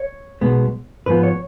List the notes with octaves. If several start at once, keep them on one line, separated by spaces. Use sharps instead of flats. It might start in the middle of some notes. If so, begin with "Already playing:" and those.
Already playing: C#5
B1 B2 G#3 B3
G#2 F3 B3 B4
C#5